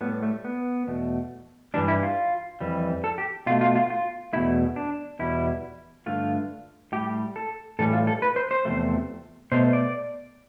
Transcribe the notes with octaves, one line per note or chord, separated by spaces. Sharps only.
A2 G3 B3
A3
B3
E2 B2 A3
G2 E3 G3 D4
E4
F4
F2 E3 G3
A4
G4
B2 A3 F4
F4
F4
F4
E2 B2 A3 E4
D4
E2 B2 G3 E4
G2 D3 A3 F4
A2 G3 G4
A4
A2 E3 G3 A4
F4
A4
B4
C5
C5
E2 C3 F3 A3
B2 A3 C5
D5